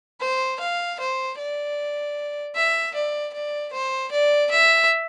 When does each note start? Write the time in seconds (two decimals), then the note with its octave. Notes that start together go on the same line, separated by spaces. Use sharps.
0.21 C5
0.60 F5
1.00 C5
1.38 D5
2.56 E5
2.95 D5
3.33 D5
3.73 C5
4.12 D5
4.51 E5